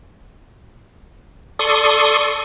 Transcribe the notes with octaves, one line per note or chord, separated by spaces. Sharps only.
A4 D5 C6 C#6 D#6